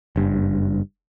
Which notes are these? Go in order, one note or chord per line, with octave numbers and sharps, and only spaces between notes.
F#1 G2